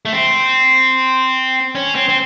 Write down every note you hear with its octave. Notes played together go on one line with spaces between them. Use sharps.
A3
C4
C#4
C4
C4